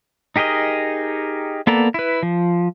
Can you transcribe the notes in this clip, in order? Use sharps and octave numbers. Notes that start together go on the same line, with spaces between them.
D#4 G4 G#4 A#4 D#5
A#3 B3 A4 D5 A#5
E4 B4
F3